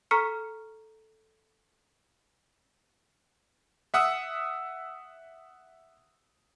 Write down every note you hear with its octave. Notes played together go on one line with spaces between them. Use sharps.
A4 A#5 C#6 F6 B6 C#7
E5 F#5 D#6 E6